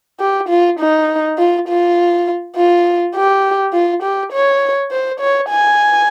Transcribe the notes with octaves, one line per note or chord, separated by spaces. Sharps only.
G4
F4
D#4
F4
F4
F4
G4
F4
G4
C#5
C5
C#5
G#5